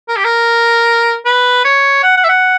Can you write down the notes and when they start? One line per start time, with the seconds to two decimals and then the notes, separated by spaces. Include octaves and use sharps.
0.08 A#4
0.17 G4
0.25 A#4
1.26 B4
1.64 C#5
2.03 F#5
2.17 F#5
2.24 E5
2.29 F#5